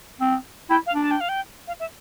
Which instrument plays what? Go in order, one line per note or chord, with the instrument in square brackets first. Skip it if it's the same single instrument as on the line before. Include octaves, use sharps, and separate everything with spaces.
[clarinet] C4
[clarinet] E4 [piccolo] G5
[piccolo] F5
[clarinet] D4
[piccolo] A5
G5
F5
G5
F5
E5